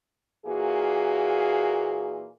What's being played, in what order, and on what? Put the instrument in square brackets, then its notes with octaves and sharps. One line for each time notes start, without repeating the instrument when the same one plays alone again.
[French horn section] A#2 E3 A#3 F#4 G#4